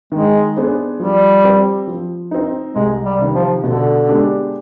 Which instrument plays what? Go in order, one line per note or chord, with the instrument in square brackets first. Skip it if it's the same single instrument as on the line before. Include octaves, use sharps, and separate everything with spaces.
[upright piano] D#3 [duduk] G#3
[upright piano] B3 D4 G#4 C5
[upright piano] F3 [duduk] G3
[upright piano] C4 G4
F3
C4 D#4
[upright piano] C2 [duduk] G#3
[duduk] G3
[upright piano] C3 D#3
[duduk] F3
[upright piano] B2 [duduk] D3
[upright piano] G#3 B3 D4 G4